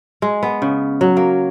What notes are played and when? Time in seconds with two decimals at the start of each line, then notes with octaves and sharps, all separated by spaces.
0.22 G#3
0.43 B3
0.62 C#3
1.01 F#3
1.17 A#3